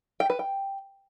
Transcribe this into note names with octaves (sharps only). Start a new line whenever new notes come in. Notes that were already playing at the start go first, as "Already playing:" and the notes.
G5
B4
G5